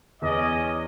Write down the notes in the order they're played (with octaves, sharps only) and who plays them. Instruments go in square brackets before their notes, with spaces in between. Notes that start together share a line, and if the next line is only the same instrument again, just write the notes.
[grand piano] E2 [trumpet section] C#4 D5 D#5